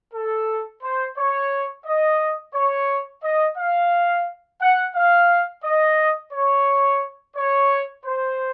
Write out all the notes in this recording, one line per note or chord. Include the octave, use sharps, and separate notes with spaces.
A4
C5
C#5
D#5
C#5
D#5
F5
F#5
F5
D#5
C#5
C#5
C5